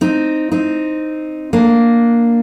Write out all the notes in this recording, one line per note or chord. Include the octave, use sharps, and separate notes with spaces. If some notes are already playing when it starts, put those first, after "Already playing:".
C4 D#4
C4 D#4
A#3 D4